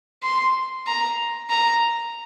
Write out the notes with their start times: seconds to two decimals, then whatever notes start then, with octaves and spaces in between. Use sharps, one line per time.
0.23 C6
0.87 A#5
1.50 A#5